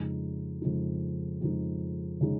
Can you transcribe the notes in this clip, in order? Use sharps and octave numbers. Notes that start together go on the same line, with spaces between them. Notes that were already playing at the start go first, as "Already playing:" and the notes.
Already playing: F2 C#3 G#3 D#4
F2 C#3 G#3 D#4
F2 C#3 G#3 D#4
C#3 G#3 D#4